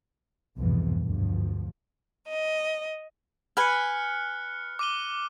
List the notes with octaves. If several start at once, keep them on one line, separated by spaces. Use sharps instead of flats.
C2 F2 G#2 B2 E3
D2 G2 F3
D#5
B4 G#5 F6 F#6 C#7
D6 D#7 G7